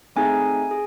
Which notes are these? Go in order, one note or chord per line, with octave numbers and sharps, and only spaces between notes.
A3 C4 D#4 G#4 G#5
G#4